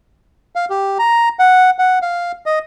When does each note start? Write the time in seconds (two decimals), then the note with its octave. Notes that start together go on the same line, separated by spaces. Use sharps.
0.56 F5
0.70 G4
0.99 A#5
1.39 F#5
1.79 F#5
2.02 F5
2.46 D#5